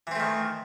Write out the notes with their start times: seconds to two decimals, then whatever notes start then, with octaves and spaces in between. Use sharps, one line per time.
0.07 E3
0.11 C4
0.16 A3
0.20 D#3